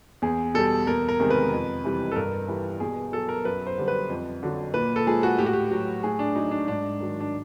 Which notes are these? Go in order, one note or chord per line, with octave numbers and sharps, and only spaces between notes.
E2 G#4
B2 G3 A4
E2 A#4
A#4
C3 D#3 G#3
B4
F2
C3 E3 G3
A4
G2 A#4
E3 G3
B2 G#4
F#3 A4
A#4
F#2 B4
C5
D3 G3
B4
F2
D3 F#3
A#2 B4
A4
F3 G#3 G#4
F#4
A2 G4
F#4
G4
F#3
A2 G#4
D4
F#3 D#4
D4
G#2 D4
D#3 F#3
D4